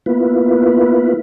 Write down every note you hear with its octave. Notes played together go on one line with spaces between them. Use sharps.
A#3 B3 E4 F4 B4